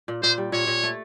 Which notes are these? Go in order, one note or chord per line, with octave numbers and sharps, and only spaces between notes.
A#2
A#2 C5
G3
A#2 C#5
A#2
A3